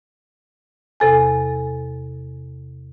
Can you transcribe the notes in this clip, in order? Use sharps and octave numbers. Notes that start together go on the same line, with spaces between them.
E2 C3 A4 G#5